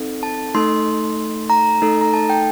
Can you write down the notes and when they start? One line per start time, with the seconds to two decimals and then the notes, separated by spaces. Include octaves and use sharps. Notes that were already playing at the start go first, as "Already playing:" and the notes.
Already playing: C4 D#4 A4
0.23 A5
0.55 A3 D#4 A4 C6
1.50 A#5
1.82 A3 D#4 A4
2.01 A#5
2.14 A5
2.30 G5